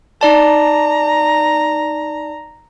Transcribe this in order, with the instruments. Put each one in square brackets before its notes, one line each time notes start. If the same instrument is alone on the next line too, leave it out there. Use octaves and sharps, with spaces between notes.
[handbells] D#4 D5 A5 [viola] A#5